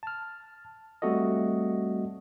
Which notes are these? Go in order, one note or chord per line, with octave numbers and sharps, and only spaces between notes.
A5 F6
G3 A3 C4 F#4 A4 D#5